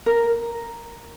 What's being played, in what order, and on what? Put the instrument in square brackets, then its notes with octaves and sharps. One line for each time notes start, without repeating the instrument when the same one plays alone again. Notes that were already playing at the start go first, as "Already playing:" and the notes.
[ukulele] A#4